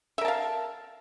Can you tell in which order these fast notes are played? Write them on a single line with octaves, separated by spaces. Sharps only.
E5 A#4 A5 F5